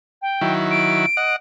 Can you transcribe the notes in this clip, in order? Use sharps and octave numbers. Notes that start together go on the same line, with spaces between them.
G5
D#3 F#3 E4
D7
D#5 F#5